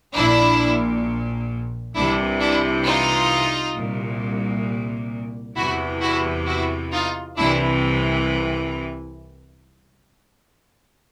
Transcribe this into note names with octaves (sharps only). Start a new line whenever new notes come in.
A#1 A#2 D4 E4
C2 C3 E3 D4 E4
D4 E4
D#4 F4
C2 A#2
E2 C3 E3 E4 F#4
E4 F#4
E4 F#4
D#4 F4
C2 C3 E3 D4 E4